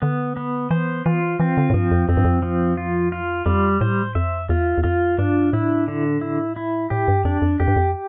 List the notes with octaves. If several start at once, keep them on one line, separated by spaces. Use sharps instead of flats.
D3 B3
B3
E3 C5
E3 F4
E3 C4
D3
A2
G2 F3
F2
F2 C4
G2
F2
F3
F4
F4
F2 G3
A2 C5
F2 E5
E2 F4
E2
F2 F4
G2 D4
A2 E4
D3
E4
E4
A2 G4
G2
F2 D4
F2
F2 G4
G2
F2